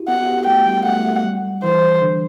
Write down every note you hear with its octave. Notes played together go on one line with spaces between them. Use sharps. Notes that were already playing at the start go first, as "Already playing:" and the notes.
Already playing: E4 F#4 G4
B3 F#5
F#4
G4
A3 G5
G3
A3 F#5
A3
G3
E3 C5
D3